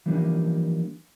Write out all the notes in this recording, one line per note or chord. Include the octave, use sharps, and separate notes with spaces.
E3 F3 G3 A#3 D4 D#4